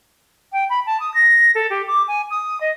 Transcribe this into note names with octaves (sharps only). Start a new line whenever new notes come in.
G5
B5
A5
D#6
A#6
A4
G4
D6
G#5
D#6
D#5